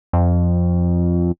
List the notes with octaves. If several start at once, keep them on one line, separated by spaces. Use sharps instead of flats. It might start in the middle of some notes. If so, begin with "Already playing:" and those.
F2